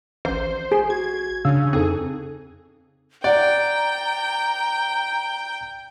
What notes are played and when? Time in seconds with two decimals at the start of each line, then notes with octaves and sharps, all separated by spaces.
0.25 A1 C5
0.72 G#4
0.90 F#4 G#6
1.45 C#3 D4 F5 E6
1.73 F2 C4 D#4 G#4 A4
3.24 D5 F#5 G5 A#5